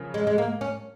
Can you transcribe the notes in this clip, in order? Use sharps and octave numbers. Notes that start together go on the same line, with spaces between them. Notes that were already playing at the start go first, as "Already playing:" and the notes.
Already playing: C#3 F3 C#4 A#4
G#3
G#3
A#3
C#4